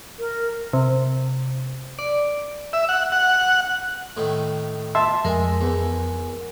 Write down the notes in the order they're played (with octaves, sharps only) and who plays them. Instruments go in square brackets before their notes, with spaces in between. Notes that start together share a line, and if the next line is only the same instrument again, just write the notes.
[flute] A#4
[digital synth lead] C3
D5
[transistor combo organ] E5
F#5
F#5
[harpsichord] A2 D#3
[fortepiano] E5 A5 [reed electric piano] C6
[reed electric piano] F2 [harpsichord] G#3 [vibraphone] A#4 G#5
[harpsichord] E2